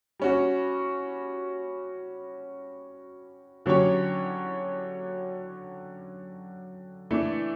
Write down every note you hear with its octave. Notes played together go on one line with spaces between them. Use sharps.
G3 C#4 F#4
D3 F#3 C#4 G4 C#5
E3 A3 D4